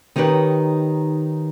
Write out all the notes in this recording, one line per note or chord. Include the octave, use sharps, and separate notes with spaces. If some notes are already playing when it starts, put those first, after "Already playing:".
D#3 D#4 E4 G4 B4 C#5